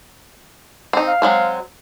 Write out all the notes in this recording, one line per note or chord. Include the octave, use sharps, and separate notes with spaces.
C4 D#4
F5
F#3 G#3 C4